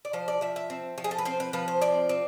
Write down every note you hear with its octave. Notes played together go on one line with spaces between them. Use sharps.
D5
F3 C5
D5
F3 E5
E5
C4
F3
G#4
A4
B4
C4 C5
B4
F3 B4
C5
C4 D5
C4